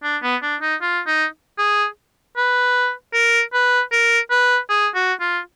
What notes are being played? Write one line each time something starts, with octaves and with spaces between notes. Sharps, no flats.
D4
B3
D4
D#4
F4
D#4
G#4
B4
A#4
B4
A#4
B4
G#4
F#4
F4